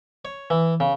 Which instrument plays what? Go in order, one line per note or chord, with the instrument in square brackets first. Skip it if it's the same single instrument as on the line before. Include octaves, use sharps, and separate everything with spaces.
[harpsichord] C#5
E3
C#3